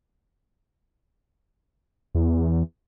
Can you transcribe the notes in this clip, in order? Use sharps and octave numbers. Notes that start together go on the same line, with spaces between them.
E2